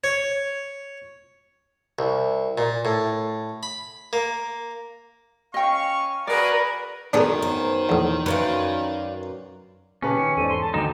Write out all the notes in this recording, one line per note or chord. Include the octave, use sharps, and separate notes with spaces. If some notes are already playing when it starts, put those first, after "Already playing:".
C#5
C2
A#2
A2
B5
A#3
C#4 D#5 F5 G5 C#6
F#4 G#4 A#4 B4 D5
F#2 D#3 B3 D4 G#4 A#4
C5
A#1 E2
F#2 B4 D5 F5
A#2 C#3 C#4 G4 B4 A5
D#3 C#7
E2 G#2 A4 C5 D5 D#7
A4 C6
A5
D2 D#3 F#3 D#4 G4 E7